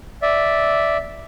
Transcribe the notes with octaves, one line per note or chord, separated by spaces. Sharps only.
D5 E5